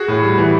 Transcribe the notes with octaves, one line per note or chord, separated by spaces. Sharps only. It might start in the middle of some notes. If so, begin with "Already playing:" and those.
Already playing: F#4 G#4
A2
G3
E3